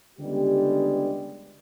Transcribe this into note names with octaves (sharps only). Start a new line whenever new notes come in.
C#2 D3 G3 G#3 B3 G4